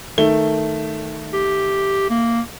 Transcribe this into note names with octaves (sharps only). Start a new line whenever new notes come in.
D#3 A3 G7
G4
A#3